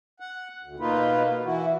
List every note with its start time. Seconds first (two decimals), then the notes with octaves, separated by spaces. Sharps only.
0.20 F#5
0.63 D2
0.80 B2 A#3 D#4 F4 B4
1.45 E3 E4 F#4